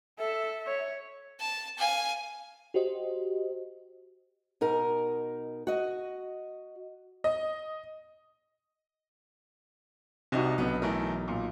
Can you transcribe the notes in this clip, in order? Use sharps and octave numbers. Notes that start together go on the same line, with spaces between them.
A4 E5
C#5
A5
F5 G#5
F#4 G4 C5 D#5
B2 D#4 A#4
F#4 D#5
D#5
C2 C3 D#4 F#4 D#5
B1 D3 B3
E3 A3 A#4
A#2